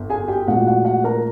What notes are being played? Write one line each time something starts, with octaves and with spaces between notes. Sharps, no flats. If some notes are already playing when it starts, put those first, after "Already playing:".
Already playing: G1
G#4 G#5
G4 G5
A#1 A2 F3 G#3 F#4 F#5
F#4 F#5
F#4 F#5
A#4 A#5